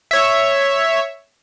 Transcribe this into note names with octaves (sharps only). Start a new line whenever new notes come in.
C#5 E5